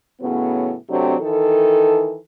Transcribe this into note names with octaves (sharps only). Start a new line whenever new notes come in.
A2 C#3 F#3 B3
C3 F#3 A3 C4 D4
D#3 E3 A4